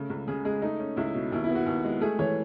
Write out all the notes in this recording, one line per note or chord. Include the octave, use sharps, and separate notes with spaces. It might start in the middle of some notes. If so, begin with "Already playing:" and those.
Already playing: C#3 A3
C#2
C#3 G#4
G#3 G#4
A3 D#4
C#4
C#2 E4
B2
D#2 E4
E4
B3
F#4
D#2
G#3
A3 G#4
E3 C#5